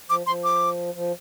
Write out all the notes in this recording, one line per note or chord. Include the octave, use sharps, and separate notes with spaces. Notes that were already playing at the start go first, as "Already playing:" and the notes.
F3 D6
F3 C6
D6
F3